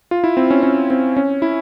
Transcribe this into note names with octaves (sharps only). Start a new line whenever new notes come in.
F4
E4
C4
C#4
C#4
C4
C#4
E4